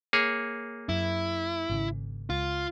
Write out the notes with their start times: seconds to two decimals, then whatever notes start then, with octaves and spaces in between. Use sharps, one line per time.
0.13 A#3 G#4 C#5
0.89 F#2 E4
1.70 G#1 C#3
2.30 C#2 F4